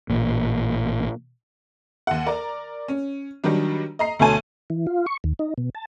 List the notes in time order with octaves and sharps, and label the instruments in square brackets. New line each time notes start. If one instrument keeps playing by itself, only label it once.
[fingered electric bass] A1 A#2
[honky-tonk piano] D#2 F#5
A#4 D5 A#5
C#4
D#3 F#3 G3 D4
D#5 A#5 C7
D2 B2 A3 C#5 G#5 A5
[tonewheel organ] E3
F4
C#6
D#2
D#4
B2
A5